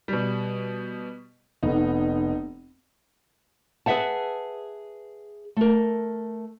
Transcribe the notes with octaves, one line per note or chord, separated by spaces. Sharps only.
B2 G3
F1 B3 D#4
G#4 B4 C#5 E5 F#5 A5
A3 A#4